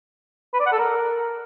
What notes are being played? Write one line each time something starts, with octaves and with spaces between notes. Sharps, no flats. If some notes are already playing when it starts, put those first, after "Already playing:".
B4
D5
F#5
A4
A#4